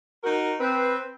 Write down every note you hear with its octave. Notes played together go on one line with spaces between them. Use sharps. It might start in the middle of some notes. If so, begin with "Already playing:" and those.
D#4 F#4 A#4
C4 B4